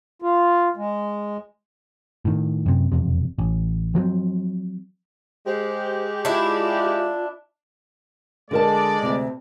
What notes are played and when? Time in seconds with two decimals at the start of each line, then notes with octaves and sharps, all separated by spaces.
0.22 F4
0.77 G#3
2.25 A2 D#3
2.66 F#2 C3
2.92 E1 F2 C3
3.38 A1
3.95 F3 F#3 A#3 C4
5.46 G#3 G4 C5
6.25 D4 E4 F4
8.51 D3 G#3 A#4 D5 A5
9.03 D2 C3